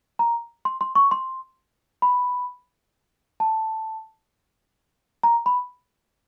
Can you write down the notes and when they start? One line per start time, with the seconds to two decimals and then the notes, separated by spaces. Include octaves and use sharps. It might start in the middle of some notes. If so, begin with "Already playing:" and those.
0.19 A#5
0.65 C6
0.81 C6
0.95 C#6
1.11 C6
2.02 B5
3.40 A5
5.23 A#5
5.46 B5